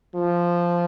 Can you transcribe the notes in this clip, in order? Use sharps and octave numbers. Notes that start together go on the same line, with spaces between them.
F3